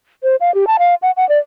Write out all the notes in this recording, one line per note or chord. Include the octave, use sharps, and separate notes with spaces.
C5
F5
G4
A5
F5
F#5
F#5
D5